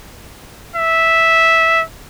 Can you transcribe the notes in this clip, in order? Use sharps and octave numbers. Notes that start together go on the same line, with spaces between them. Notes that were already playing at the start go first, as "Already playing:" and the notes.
E5